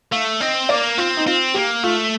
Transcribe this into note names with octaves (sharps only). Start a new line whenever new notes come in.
A3 F5
C4 D#5
A#3 D5
C4 F4
D#4
C4 F4
A#3 G4
A3 F4